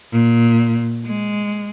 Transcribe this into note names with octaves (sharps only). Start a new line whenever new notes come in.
A#2
G#3